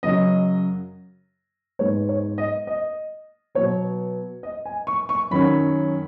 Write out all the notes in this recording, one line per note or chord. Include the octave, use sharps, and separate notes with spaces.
F#2 C#3 F#3 D#5
G#2 G#3 B3 C#5
C#5
D#5
D#5
B2 F#3 B3 C#5
D#5
G#5
C#6
C#6
F#2 D#3 F#3 C#4 B5